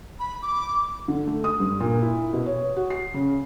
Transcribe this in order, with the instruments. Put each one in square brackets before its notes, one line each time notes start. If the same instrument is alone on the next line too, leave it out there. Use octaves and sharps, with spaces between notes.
[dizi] B5
D6
[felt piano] D3
A3
D#6
G2
A#2
E4
B2
C#5
F#4
C7
C#3